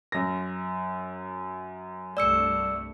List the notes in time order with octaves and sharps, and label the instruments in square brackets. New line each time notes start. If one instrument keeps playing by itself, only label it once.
[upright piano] F#2 A#6
[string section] C2 G2 A3 [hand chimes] D5 E6 C#7